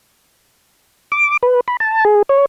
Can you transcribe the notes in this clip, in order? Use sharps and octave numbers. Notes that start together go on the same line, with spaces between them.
D6
B4
B5
A5
G#4
C#5